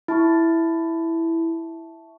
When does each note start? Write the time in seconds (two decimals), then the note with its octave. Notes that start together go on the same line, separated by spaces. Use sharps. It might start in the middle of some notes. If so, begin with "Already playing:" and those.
0.08 E4 E5 A5 C#6